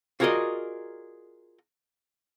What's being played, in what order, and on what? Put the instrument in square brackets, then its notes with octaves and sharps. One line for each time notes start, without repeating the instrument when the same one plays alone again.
[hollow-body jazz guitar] F4 F#4 G#4 A#4 D5 D#5